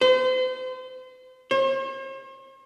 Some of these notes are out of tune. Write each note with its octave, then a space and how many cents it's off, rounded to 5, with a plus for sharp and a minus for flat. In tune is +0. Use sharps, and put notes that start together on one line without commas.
C5 -35
C5 +45